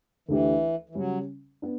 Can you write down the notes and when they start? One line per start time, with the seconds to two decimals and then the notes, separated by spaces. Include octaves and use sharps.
0.29 D2 D3 E3 A3 D4 G4
0.89 E3
0.95 C#3 F#3 G3 C#4
1.62 B3 D4